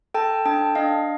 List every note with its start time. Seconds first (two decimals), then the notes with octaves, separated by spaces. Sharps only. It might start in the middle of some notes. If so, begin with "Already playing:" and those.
0.14 A4 G5 A5
0.45 D4 G5 A5
0.75 D4 D#5 F5